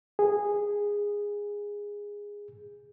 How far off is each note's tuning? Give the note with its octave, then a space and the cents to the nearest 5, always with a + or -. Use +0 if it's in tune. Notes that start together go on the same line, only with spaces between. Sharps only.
G#4 -15